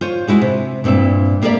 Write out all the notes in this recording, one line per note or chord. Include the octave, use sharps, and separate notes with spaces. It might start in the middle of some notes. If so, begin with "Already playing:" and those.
F4 C5 C#5
G#3 E4 F#4 G#4
C3
G2 A#2 C4 E4 E5
G3 A#3 G4 A#4 D5 E5